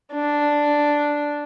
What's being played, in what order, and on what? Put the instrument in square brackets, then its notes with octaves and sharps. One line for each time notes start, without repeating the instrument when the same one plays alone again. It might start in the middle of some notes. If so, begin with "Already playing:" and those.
[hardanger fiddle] D4